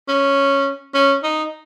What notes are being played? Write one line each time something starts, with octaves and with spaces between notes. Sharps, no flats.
C#4
C#4
D#4